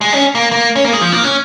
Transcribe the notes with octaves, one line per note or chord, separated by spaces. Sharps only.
G#3
C#4
A#3
A#3
C#4
A#3
G#3
F3
A#3
C#4